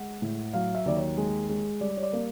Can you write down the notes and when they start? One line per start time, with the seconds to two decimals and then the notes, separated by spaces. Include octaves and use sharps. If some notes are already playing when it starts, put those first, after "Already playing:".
Already playing: G#3 F#5
0.22 A2
0.53 F#3 F5
0.75 E5
0.86 D#2 D5
0.96 C#5
1.17 G#3
1.49 G#3
1.81 G3 D5
1.97 C#5
2.03 D5
2.13 A#3